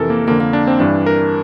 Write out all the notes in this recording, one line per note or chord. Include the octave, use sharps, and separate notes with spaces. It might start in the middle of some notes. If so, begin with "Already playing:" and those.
Already playing: F2 C3 E3 A4 A#4
A#3
F2 D3 A#3
A#3
D4
C4
G2 E3 D4
A#4